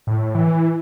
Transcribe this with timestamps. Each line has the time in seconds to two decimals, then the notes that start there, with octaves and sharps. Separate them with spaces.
0.07 A2
0.35 E3